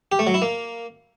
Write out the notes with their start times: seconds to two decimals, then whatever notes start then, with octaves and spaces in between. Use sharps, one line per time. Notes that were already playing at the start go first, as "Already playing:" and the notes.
0.12 G4
0.19 A3
0.27 F#3
0.34 E4
0.42 A#3